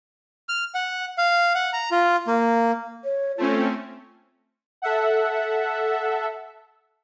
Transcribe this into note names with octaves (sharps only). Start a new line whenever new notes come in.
F6
F#5
F5
F#5
A#5
F4
A#3
C#5
A3 C4 C#4 F4
A4 E5 F#5